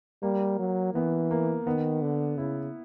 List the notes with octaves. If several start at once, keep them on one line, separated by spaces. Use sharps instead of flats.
G3 A#3
F#3
E3 B3
A#3
D#3 B3
D3
C#3 E4